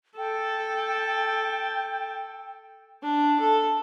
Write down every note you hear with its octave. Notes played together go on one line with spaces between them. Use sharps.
A4 G5
D4
A4